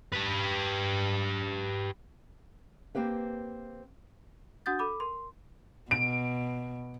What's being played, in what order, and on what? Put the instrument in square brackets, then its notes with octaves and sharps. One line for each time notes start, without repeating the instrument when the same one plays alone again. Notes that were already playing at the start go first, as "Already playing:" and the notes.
[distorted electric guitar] G4 B4
[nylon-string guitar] A#3 C4 G4 B4 F5
[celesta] D4 F#4 F#5 D#6 G6 A6
A4 B5 D6
A#4 C6
[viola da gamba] B2 [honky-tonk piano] D7